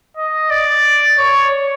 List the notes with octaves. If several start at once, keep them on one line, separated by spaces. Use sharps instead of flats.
D#5
D5
C#5